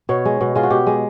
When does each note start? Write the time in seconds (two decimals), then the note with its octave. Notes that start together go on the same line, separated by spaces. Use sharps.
0.09 B2 C#5
0.25 G#3
0.41 B2
0.55 G#3 F4
0.63 F#4
0.70 B2 G4
0.87 G#3